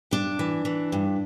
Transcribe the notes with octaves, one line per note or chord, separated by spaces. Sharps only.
G2 D4
E3
E3
G2